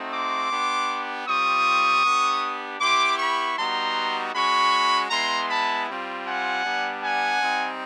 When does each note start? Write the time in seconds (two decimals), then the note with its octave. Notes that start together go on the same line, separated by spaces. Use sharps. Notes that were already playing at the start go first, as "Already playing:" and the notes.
Already playing: A3 C4 D#4 F#4
0.11 C6 D6
0.50 B3 D4 G4
1.26 G3 C4 F4 C#6 D#6
2.03 B3 D4 G4
2.79 B3 E4 G4 C6 D6
3.18 B5 C#6
3.56 G3 B3 D#4 F#4 A#5 C6
4.34 G#3 C#4 F#4 B5 C#6
5.10 G#3 B3 E4 A#5 C6
5.48 A5 B5
5.87 G3 C4 F4
6.25 F#5 G#5
6.63 G3 B3 D4
7.01 F#5 G#5
7.39 G3 C4 D#4